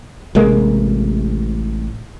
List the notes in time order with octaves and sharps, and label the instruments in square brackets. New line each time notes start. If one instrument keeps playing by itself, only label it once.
[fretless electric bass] A1 C3 G#3 A#3